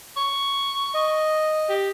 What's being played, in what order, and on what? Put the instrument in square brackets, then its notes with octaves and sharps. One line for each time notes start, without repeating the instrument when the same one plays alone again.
[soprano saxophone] C#6
[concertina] D#5
[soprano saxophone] G4